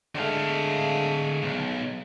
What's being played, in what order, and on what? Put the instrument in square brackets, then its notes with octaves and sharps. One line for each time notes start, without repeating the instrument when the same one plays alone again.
[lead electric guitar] D3 F5 [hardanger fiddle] G#3 A3
[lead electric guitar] B1